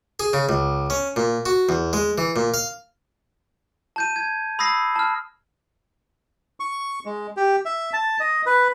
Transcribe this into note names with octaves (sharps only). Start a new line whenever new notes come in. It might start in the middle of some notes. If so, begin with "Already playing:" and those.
G#4
C#3
C#2
C#4
A#2
F#4
E2
G#3
E3
A#2
F5
A5 G6 D#7
G#6
B5 D#6 E6 A#6 C7
A5 F6
C#6
G#3
G4
E5
A5
D#5
B4